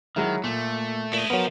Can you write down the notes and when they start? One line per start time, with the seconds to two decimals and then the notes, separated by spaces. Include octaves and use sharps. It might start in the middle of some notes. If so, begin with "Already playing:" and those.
0.16 D#3 F#3 G#3 E4
0.44 A#2 A3
1.13 A#2 E4 D#5
1.30 F3 F#3 B3 A#4